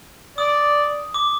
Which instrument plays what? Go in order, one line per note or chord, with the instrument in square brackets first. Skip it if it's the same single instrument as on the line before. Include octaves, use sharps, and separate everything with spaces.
[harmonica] D5 [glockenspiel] D#6
[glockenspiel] D6